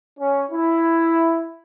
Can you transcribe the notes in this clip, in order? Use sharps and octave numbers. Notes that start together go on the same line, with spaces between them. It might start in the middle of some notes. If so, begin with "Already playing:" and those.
C#4
E4